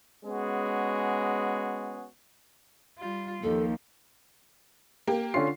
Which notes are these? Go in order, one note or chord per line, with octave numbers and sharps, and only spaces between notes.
G#3 B3 C#4 F#4 G#4
G3 F4
D#2 F3 A4
A#3 G4
D3 C#4 F4 C7